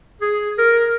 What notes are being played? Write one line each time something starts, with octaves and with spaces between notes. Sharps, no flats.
G#4
A#4